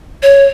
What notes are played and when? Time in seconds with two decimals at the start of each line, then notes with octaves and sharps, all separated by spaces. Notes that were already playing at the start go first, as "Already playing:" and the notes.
0.23 C#5